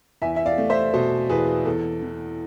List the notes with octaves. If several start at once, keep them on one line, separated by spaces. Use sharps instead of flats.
E2 E5 G#5
E5
D5 F5
A3
C5 E5
B2 A4 C5
E2 G#4 B4
E2 A4
E3